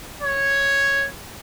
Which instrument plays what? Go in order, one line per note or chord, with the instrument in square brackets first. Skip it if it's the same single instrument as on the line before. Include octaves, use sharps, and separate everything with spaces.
[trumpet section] C#5